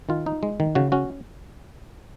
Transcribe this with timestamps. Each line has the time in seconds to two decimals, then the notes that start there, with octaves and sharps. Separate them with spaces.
0.09 D#3 F4
0.26 D#4
0.43 G#3
0.60 D#3
0.75 C#3 F#4
0.92 C#4 F#4